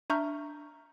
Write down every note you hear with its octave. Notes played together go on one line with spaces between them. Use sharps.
D4 E5 A#5 C#6 F6 G6